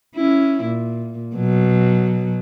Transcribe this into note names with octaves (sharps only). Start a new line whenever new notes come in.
C#4 E4
A#2
B2 F#3